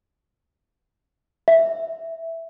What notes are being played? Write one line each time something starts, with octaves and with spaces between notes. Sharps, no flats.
E5